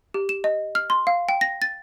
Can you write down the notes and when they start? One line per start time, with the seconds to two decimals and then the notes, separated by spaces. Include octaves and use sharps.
0.14 G4
0.29 E7
0.44 D#5
0.75 F6
0.90 C6
1.07 F5
1.29 G5
1.41 A#6
1.62 A6